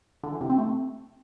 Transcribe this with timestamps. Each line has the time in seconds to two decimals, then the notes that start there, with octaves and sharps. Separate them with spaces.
0.23 D3
0.32 E3
0.41 C3
0.50 C4
0.58 A3